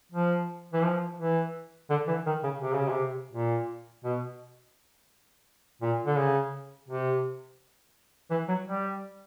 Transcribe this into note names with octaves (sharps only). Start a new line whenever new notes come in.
F3
E3
F3
E3
D3
E3
D#3
C#3
C3
C#3
C3
A#2
B2
A#2
D3
C#3
C3
E3
F#3
G3